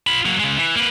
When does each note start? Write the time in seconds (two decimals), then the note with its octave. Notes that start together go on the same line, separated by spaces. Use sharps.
0.07 F4 B5
0.26 F#3 A#3
0.39 C#3 G#3
0.59 E3
0.76 A#3 B4